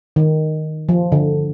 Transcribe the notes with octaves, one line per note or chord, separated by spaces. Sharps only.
D#3
F3
D3